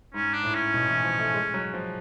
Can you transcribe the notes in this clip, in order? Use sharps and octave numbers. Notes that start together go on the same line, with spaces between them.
G#2 C#4
D4
A2
C#4
B2
E3
F3
A3
G#3
F#3
F3